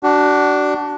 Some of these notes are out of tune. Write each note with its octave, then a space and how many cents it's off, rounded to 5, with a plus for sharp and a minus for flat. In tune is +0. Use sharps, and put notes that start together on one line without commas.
D4 +0 F#4 +30